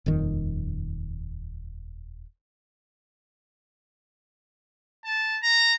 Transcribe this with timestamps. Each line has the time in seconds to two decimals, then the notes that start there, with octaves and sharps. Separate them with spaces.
0.06 D#1 F2 D#3
5.05 A5
5.43 A#5